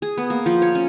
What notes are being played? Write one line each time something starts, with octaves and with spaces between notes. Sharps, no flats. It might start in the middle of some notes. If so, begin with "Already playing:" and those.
G#4
B3
A#3
F3
C#5
C#4